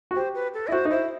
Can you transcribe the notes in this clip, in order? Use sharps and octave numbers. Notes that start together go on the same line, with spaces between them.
F#4
G4 C5
B4
A4
E4 D#5
F#4 C5
D#4
E4 C5